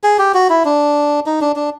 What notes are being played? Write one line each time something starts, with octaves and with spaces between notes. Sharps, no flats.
G#4
G4
F#4
E4
D4
D#4
D4
D4